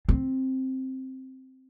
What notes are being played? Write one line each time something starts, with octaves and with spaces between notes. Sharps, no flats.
C4